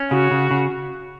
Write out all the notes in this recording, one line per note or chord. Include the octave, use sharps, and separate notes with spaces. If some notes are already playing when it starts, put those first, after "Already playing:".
Already playing: C#4
C#3 F#4
C#3
C#3